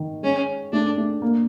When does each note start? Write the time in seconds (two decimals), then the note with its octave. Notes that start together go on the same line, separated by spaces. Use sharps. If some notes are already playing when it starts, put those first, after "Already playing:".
Already playing: D#3
0.23 G#3 C#4
0.73 A3 D4
0.97 A3
1.22 A#3